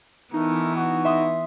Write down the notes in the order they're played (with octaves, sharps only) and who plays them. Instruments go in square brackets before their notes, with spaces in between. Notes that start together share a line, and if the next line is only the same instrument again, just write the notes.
[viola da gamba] E3 B3 [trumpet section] A3 A#4 [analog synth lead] D#4
[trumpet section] F#4
[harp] E5 C6 D#6